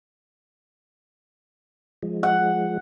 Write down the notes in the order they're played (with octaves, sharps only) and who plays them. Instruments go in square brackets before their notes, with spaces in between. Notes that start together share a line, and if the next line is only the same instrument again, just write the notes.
[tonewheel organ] F3 G#3
[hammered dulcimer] F#5